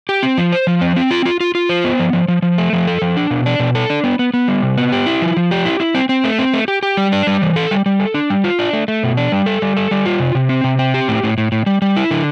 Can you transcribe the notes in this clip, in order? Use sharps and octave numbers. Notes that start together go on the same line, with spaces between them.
G4
C4
F3
C5
F3
C4
C4
F4
F4
F4
F4
C5
B3
F3
F3
F3
F3
A3
F3
A4
F3
D4
B2
D4
B2
A4
D4
B3
B3
B3
G3
C3
B3
G4
E4
F3
F3
G4
E4
E4
C4
C4
A3
C4
A3
G4
G4
G3
D4
G3
E3
A4
G3
G3
A4
D4
G3
F4
D4
A3
A3
B2
D4
G3
A4
G3
A4
G3
F4
C3
C3
C4
C3
C4
G4
A2
A2
A2
A2
G3
G3
E4
D3